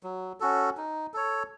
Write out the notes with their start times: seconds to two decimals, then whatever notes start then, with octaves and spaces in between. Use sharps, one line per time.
0.03 F#3
0.40 C#4 F#4 A4
0.77 D#4
1.14 A4 C#5